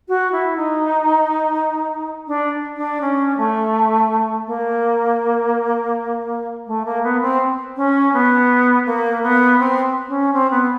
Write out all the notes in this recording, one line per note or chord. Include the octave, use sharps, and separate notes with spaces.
F#4
E4
D#4
D4
D4
C#4
A3
A#3
A3
A#3
B3
C4
C#4
B3
A#3
B3
C4
C#4
C4
B3